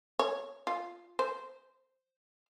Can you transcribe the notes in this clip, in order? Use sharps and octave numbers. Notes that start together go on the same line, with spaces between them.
C#5
F4
C5